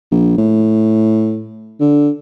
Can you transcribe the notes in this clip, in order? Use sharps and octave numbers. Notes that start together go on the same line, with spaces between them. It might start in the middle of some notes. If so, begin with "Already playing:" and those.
A#1
A2
D3